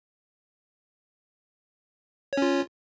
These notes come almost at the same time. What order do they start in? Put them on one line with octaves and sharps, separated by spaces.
C#5 C#4 F4